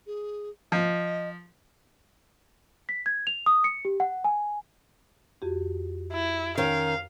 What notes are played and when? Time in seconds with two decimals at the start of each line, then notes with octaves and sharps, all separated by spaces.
0.07 G#4
0.72 F3 D#5
2.89 B6
3.06 G#6
3.27 F7
3.46 D#6
3.64 C#7
3.85 G4
4.00 F#5
4.24 G#5
5.42 F2 F#4 G4
6.12 E4
6.58 D#3 C#4 F5